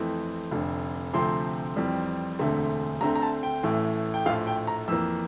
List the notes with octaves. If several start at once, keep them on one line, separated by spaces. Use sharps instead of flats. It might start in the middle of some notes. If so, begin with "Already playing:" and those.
Already playing: F2 E3 A3 C4
F1 F2 D3
D2 C3 F3 A3 C4 C6
F2 E3 G3 C4
E1 D2 D3 A3 C4
D2 D3 A3 C4 A#5
A#5
A5
G5
A1 A2 E3 A3
G5
A#1 A2 F3 A3 F5
G5
A#5
F2 E3 A#3 E6